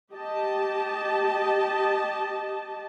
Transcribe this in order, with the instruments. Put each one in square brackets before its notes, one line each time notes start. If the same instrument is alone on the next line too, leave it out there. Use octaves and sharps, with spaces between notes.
[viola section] G4 D#5 A5